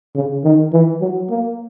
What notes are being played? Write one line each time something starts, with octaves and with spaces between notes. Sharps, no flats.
C#3
D#3
E3
F#3
A#3